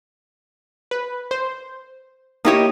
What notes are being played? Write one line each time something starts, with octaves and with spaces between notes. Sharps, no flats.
B4
C5
A#3 D#4 E4 G4 C#5 D#5